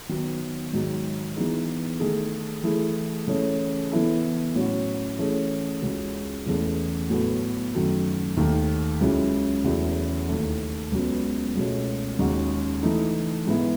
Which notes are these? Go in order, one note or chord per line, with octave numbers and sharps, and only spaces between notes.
D#3 F#3 B3
G#2 D#3 F#3
E3 B3 D#4 G#4
D#3 A3 D#4 G#4
E3 A3 E4 G#4
C#3 E3 A3 C#4 G#4
E3 B3 E4 A4
A2 F#3 C#4 F#4
E3 A3 C#4 G#4
C#2 C#3 G#3 C#4 F#4
E2 C#3 E3 A3
A2 F#3 B3 F#4 A4
F#2 D#3 F#3 A3
D#2 D#3 A3
C#2 C#3 F#3 C#4 E4
E2 C#3 F#3 A3 E4
D#2 D#3 A3
C#2 C#3 F#3 B3
C#2 B2 A3 C#4
D#2 C#3 G#3 D#4 F#4
E3 A3 D#4
G#2 E3 B3 E4